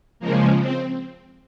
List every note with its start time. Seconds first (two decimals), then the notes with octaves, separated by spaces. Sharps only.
0.20 C#3 F3 G#3 A#3
0.59 C4